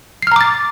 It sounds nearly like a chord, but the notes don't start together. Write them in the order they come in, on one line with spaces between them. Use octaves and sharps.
C7 F6 A#5 D6 A6